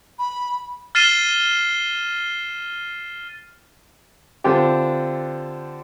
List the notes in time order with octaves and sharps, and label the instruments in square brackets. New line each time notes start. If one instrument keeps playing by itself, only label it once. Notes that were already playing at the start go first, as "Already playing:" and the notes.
[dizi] B5
[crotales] F6 A6 C7 D#7 E7 G7
[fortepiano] D3 C4 D4 F4 G4